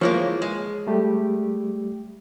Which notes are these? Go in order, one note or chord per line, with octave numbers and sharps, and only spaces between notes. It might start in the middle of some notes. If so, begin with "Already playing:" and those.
E3 F3 G#3 A#3 C#5
G#3
G3 A3 G4